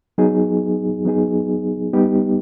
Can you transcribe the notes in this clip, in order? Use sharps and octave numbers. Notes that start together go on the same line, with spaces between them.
F#3 B3 D#4 G#4
F#3 B3 D#4 G#4
G3 B3 D#4 G4